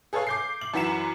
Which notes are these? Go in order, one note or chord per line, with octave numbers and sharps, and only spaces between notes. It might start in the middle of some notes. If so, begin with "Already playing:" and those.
G#4 A4 B4 C#5 F5
D6 G6 C7
F#7
F#2 E3 F#5 B6 E7